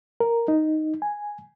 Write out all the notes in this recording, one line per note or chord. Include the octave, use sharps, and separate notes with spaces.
A#4
D#4
G#5